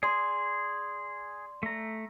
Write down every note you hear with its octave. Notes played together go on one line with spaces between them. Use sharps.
G#4 D5 C6
A3 A#5